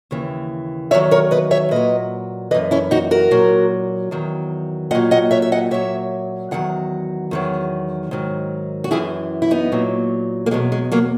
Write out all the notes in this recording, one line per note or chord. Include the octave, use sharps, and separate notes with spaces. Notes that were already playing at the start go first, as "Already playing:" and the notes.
D#2 C#3 E3
E2 D#3 F#3 C#5 E5
A#4 C#5
B4 D#5
C#5 E5
A#2 F#3 B4 D#5
F#2 E3 B4 D#5
C#4 E4
D#4 F#4
F#4 A#4
A#2 F#3
E2 D#3 F#3
A#2 F#3 D#5 F#5
D#5 F#5
C#5 E5
E5
D#5 F#5
A#2 F#3 C#5 E5
E2 D#3 F#3 F#5
E2 D#3 F#3
G#2 D#3 F#3
F#4
F#2 E3 E4 G#4
E4
B3 D#4
A#2 F#3
A#3
E2 B2 F#3 G#3 B3
G#3
F#3 A#3